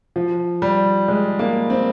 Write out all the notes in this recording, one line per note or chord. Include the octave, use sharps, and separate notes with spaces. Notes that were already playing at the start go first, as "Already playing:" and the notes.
F3
G3
G#3
A#3
C4